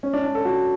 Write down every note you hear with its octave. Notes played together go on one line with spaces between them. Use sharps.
C#4
D4
D4
A4
F#4